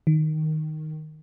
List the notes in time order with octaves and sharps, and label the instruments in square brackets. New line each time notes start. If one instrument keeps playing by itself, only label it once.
[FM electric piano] D#3